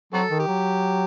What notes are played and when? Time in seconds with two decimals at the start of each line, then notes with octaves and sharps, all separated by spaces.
0.13 F#3 C4 F#4 A4
0.30 D#3
0.40 G4
0.48 F#3